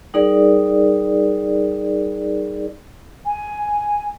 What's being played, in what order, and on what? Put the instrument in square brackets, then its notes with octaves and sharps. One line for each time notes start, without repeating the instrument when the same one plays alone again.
[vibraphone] G3 D#4 G#4 A#4 D5
[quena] G#5